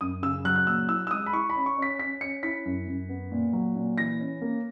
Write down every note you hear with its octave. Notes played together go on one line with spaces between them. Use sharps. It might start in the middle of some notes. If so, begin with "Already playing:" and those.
F#2 D#6
C#3 E6
F#3 F#6
F#6
A#2 E6
E4 E6
E6
G#3 D#6
B5
E4 C#6
B5
C#4
C#6
C#4
B6
C#4 B6
C#4 C#7
E4 B6
F#2
F#2
B3
A#2
F#3
A#2
E3 A#6
C#4
A#3